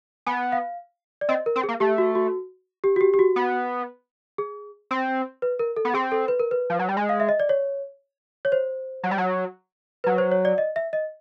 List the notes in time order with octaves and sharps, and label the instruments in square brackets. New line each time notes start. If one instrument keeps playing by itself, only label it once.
[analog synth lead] B3 [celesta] G#5
[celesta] F5
D5
[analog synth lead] C4 [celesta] D#5
[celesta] A#4
[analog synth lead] C4
[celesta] G#4
[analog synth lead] A#3
[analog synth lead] A3 [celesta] G4
[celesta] F#4
F#4
G4
F#4
G4
G4
F#4
[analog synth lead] B3
[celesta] G#4
[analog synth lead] C4
[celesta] B4
A#4
A4
[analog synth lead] B3
[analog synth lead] C4 [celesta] G#4
[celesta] A4
B4
A#4
B4
[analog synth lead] F3
F#3
G3
G#3
[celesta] F5
E5
D#5
D5
C#5
C#5
C5
[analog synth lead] F#3
G3
F#3
[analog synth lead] F#3 [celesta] B4
[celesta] C5
C#5
D5
D#5
E5
D#5